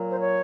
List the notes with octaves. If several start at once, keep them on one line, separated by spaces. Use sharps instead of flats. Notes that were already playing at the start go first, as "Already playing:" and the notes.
Already playing: A#2 F#3
C5
C#5